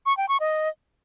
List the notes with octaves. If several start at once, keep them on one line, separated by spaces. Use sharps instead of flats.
C#6
G5
C#6
D#5